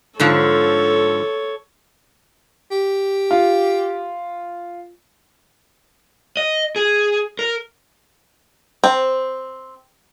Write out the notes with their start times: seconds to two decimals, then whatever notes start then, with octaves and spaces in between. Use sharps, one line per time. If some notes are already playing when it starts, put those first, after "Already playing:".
0.20 G#2 D3 F3 A4 C#5
2.72 G4
3.31 F4
6.37 D#5
6.76 G#4
7.39 A#4
8.84 C4